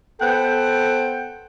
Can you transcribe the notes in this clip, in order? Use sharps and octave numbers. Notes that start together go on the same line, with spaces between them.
B3 A4 C5 F#5 G5